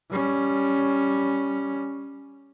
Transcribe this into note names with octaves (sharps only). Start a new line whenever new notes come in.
G3 C#4